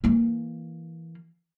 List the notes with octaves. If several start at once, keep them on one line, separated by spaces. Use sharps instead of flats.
E3 A#3